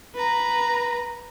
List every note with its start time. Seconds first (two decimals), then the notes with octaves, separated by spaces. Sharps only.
0.15 B4 A#5